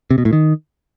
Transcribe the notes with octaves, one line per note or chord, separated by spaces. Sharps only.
C3
B2
A2
D#3